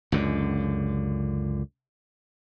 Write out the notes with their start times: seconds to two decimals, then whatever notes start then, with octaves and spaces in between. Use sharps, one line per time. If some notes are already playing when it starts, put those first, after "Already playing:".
0.12 C#2 F#2 D3